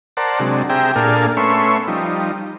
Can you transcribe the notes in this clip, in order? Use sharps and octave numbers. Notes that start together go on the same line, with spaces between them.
A#4 C5 D5 F#5 A5
C3 F#3 G#3 D4
C4 G4 G#4 E5 G5 A#5
A#2 A#3 D4 G#4 A4 F5
A3 B3 C#4 E5 C6 C#6
F3 G3 D#4